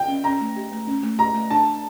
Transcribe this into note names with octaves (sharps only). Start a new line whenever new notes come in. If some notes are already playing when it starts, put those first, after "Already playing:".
Already playing: G5
C#4
C#4 A#5
A3
G4
A3
C#4
A3
G4 A#5
A3
D4 A5
A3